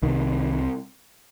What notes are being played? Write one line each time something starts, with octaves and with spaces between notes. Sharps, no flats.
C2 C3 D#3